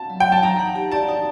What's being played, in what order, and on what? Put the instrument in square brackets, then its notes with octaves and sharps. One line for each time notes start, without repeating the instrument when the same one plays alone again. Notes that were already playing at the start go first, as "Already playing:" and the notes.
Already playing: [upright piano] A5
[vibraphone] F#3
[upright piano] G5
[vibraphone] F#3
[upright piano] A5
[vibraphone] D#4 [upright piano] A#5
[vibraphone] F#5
G4
[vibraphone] D5 [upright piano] A5
[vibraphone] D#4